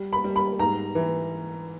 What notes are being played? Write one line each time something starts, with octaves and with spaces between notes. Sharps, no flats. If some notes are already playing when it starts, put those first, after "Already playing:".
Already playing: G3
B5
G3
B5
G#2 A#5
E3